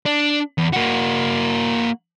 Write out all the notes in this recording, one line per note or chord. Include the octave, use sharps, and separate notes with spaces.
D4
E2
A#3 F#4